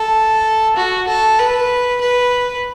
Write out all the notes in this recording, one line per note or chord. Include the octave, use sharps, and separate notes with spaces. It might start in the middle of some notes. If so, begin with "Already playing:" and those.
Already playing: A4
F#4
A4
B4
B4